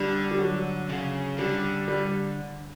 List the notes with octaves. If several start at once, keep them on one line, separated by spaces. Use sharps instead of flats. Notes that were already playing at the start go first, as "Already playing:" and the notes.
Already playing: D3 G3
G3
F#3
C#3
D3 G3
G3